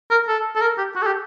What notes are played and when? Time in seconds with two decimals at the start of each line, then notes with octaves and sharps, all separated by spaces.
0.11 A#4
0.28 A4
0.56 A4
0.62 A#4
0.78 G4
0.95 F#4
1.02 A4
1.07 G4